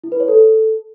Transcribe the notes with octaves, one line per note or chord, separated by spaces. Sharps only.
E4
B4
C#5
A4